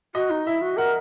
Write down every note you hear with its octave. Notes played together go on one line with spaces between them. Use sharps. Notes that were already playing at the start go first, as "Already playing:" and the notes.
F#4 D#5
D#4
E4 E5
F#4
A#4 F#5